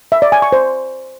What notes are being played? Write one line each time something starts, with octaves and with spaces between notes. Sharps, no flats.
E5
D5
G#5
C#6
C5